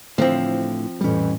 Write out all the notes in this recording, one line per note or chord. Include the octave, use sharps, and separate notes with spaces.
A2 D3 E3 F3 C4
F2 A2 E3 G3 C#4